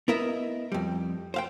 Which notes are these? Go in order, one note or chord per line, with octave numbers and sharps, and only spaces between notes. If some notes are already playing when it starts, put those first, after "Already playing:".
B3 E4 A#4 D#5 E5
F2 G3
C5 F5 G5